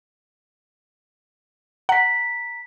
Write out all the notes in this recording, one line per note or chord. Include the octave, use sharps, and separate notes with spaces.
F#5 A#5 B6